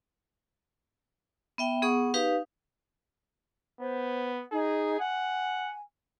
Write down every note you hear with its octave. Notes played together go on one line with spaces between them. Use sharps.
B3 E5 G5
B3 G#4 F#5 C#6 D#6
D#4 G4 B4 F5 D#6
B3 C5
D#4 G#4
F#5 G#5